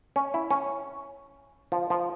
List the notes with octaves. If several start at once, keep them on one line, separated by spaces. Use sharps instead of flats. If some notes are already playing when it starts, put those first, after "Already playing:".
C#4
E4
C#4
F3
F3